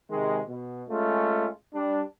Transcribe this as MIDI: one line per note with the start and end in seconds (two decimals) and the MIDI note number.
0.11 0.40 48
0.11 0.40 51
0.11 0.40 56
0.48 0.83 47
0.89 1.48 56
0.89 1.48 57
0.89 1.48 61
0.89 1.48 65
1.75 2.02 55
1.75 2.02 62